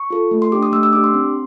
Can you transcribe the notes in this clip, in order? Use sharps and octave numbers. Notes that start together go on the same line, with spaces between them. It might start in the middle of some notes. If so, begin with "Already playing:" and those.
Already playing: C#6
F4 A4
A3
C6
D4 G4 D6
D#6
A3 E6
E6
D4 G4 D6
C6
C4